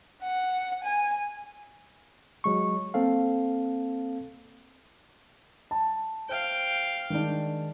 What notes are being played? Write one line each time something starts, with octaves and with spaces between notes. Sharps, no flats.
F#5
G#5
F#3 G#3 C#6
A#3 C4 A4 F5
A5
C5 F5 G5
D#3 G#3 D4